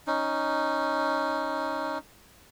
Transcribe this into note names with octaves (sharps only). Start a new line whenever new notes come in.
C#4 D#4